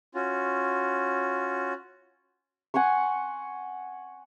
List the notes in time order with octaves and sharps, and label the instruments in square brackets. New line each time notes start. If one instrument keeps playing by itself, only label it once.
[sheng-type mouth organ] C#4 F4 F#4
[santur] F#5 G#5 C6 C#6